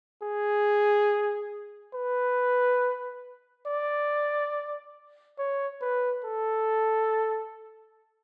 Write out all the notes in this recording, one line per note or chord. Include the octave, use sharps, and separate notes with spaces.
G#4
B4
D5
C#5
B4
A4